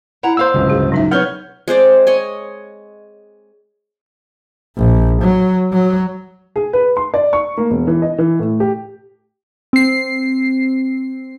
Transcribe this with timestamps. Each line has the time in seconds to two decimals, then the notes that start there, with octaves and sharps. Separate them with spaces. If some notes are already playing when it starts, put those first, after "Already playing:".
0.23 E4 F#5 A#5
0.37 A#3 C5 F5 E6
0.54 D1 G1 C#2
0.69 G#4
0.92 F#3 D#4 E5
1.11 B3 C#4 C#5 F#5 F6 G6 G7
1.68 G#3 C4 C5 D5
2.07 C#5 D#5 G#5
4.77 A#1
5.22 F#3
5.73 F#3
6.56 G#4
6.73 B4
6.97 C6
7.14 D5
7.33 C#6
7.58 A#3
7.71 E1
7.87 E3
8.02 D#5
8.18 E3
8.39 A2
8.60 G4
9.73 C4 C7